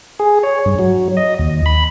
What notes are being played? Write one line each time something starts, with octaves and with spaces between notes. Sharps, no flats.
G#4
C#5
G2
F#3
D#5
D#2
B5